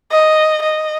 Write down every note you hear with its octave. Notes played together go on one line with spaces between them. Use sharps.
D#5
D#5